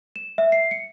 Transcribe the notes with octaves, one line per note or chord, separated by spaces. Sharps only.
E7
E5
C7
C#7